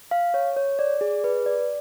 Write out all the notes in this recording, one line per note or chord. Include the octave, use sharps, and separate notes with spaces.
F5
C#5
C#5
D5
G#4
B4
D5